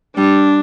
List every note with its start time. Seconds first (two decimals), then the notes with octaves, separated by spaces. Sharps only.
0.16 G3 D4